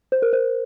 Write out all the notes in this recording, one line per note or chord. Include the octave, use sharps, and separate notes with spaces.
C5
A#4
C5